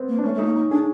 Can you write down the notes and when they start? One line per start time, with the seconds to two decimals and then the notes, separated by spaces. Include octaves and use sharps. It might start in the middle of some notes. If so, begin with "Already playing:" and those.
Already playing: B3 C4
0.08 A#3
0.19 D4
0.24 A3 C#4
0.34 A3
0.39 D#4
0.44 A#3
0.55 A#3 D#4
0.71 D4 G#4